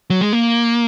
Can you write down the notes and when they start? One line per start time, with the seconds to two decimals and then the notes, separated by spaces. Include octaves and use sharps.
0.10 F#3
0.21 G#3
0.33 A#3